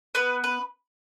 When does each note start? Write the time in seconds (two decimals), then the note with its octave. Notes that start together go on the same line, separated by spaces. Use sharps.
0.15 B3 B4
0.44 B4